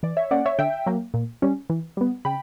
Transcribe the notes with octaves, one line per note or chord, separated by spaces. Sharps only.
E3 D5
C#5 E5
A#3 C#4 D5 F#5
C#5 E5
D3 E5 G5
F#3 A#3
A#2
G3 C#4
E3
G3 B3
C#3 G5 B5